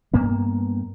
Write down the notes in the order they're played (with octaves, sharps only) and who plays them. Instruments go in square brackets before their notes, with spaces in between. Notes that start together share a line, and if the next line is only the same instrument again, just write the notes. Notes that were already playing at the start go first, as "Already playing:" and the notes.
[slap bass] G2 A#3 B3